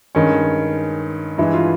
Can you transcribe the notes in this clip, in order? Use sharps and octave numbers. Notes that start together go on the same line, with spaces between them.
G2 D#3 G#3 C#4
G2 E3 G#3 E4
F4